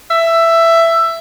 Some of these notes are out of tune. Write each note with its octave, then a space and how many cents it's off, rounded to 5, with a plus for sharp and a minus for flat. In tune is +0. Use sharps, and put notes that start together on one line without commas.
E5 +10